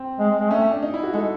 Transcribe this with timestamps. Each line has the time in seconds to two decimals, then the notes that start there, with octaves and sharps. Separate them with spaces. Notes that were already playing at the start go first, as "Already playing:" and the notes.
Already playing: C4
0.19 G#3
0.40 G#3
0.51 A3 C#4
0.62 C#4
0.72 D4
0.83 D#4
0.94 E4
1.03 F#4
1.14 G#3 A4